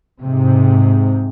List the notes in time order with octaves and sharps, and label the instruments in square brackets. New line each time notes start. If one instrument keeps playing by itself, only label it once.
[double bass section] G#2 C3